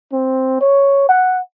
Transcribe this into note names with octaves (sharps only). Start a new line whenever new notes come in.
C4
C#5
F#5